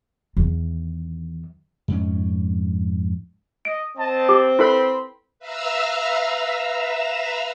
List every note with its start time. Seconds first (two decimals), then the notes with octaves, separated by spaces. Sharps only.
0.37 E2 D#3
1.88 F2 G#2 C#4
3.65 D#5 D7
3.97 C4 D#5 A5
4.29 G4 D6
4.59 E4 A4 B4 B5 C6
5.39 B4 E5 F5 A#5 E6 F6